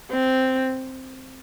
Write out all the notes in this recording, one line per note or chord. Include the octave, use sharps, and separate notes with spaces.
C4